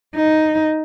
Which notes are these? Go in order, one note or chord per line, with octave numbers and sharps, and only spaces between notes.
D#4